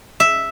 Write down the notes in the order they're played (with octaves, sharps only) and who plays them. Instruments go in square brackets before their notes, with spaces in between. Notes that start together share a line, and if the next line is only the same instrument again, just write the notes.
[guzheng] E5